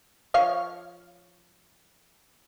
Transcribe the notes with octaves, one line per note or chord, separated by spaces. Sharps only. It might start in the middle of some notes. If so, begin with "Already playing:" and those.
F3 C#5 F5